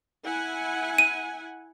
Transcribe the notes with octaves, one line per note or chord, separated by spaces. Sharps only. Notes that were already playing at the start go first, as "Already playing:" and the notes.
E4 F#5 G#5
D#7